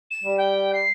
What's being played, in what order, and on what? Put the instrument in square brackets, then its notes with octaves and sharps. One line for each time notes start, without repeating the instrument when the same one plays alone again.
[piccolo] E7
[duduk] G3
[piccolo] G5
C7